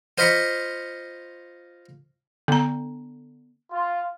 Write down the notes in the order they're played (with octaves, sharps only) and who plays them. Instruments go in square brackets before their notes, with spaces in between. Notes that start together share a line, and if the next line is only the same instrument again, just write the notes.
[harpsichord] F4 C5 D#5 F5 B5 C#6
[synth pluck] D3 [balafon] B3 A#5
[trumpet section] F4